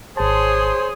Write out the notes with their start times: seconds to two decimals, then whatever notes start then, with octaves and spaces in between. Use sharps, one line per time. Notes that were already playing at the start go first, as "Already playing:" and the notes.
0.17 G#1 G#4 C5 C#5 A5 C6